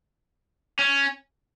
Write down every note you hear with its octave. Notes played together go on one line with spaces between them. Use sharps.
C#4